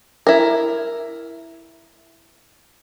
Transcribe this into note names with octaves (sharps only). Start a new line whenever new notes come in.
E4 A#4